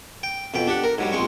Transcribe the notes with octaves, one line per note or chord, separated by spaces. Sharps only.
G5
F2 B2 G5
D4 G4 F#5
A#4
G#2 F#3 G3
A#1 G#3 C4 C#6